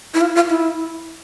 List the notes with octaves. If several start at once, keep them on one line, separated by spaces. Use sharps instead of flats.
E4
F4
F4
E4